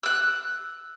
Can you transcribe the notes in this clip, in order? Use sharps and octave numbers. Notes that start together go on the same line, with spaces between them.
E6 F#6